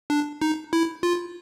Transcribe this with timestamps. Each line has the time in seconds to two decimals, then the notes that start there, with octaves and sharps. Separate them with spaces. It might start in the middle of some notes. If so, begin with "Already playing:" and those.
0.10 D4
0.42 D#4
0.73 E4
1.03 F4